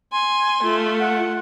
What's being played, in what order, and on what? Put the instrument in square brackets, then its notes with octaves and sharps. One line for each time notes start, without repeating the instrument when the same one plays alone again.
[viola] G#5 [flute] C6
[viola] A3 [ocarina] F4
[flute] F#5